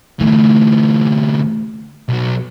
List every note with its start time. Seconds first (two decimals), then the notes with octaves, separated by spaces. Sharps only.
0.20 D2 E3 A3
2.09 B1 F#3